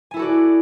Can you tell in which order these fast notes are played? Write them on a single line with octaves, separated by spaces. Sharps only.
G#5 E4 A4 F#4 D5